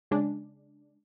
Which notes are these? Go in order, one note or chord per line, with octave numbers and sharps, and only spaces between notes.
C#3 G#3 D4